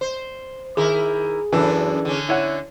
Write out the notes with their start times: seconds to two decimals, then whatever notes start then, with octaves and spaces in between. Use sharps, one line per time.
0.01 C5
0.77 D#3 E4 G#4 A#4
1.53 F#2 E3 D4 A4
2.05 D3 C#4
2.29 E4 C#5 F#5